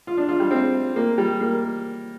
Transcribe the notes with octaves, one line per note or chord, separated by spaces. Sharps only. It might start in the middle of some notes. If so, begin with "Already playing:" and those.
F4
D4
F4
G3
C4
A#3
G3
A#3